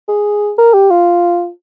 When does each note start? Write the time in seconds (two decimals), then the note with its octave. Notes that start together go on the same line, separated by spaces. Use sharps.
0.08 G#4
0.58 A#4
0.73 G4
0.90 F4